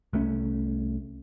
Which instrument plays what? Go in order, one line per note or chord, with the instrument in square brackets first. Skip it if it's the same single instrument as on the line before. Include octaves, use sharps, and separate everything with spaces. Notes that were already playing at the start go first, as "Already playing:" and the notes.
[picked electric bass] C2 A3 C#4